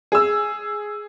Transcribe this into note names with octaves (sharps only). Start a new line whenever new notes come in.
G#4 E6